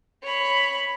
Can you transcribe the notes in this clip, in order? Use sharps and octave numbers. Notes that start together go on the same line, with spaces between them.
C#5 B5